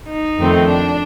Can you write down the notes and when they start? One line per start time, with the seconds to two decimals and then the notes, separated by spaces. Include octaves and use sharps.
0.09 D#4
0.38 F2 D#3 A3 C4
0.67 D4